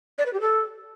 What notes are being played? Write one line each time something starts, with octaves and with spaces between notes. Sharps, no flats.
D5
B4
G4
A4